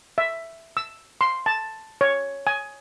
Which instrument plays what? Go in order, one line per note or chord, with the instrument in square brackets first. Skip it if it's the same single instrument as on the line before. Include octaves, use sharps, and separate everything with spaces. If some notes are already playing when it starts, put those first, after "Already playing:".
[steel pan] E5
E6
C6
A5
C#5
G#5